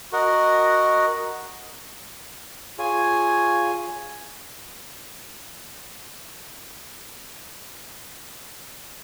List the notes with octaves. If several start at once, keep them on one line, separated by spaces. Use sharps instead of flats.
F#4 A#4 D#5 F#5
F4 G#4 C#5 G#5